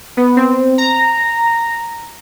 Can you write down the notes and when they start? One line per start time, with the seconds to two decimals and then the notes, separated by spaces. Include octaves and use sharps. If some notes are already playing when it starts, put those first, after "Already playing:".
0.17 B3
0.37 C4
0.78 A#5